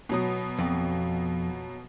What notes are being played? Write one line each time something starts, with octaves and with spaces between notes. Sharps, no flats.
B2 F#3 D#6
F2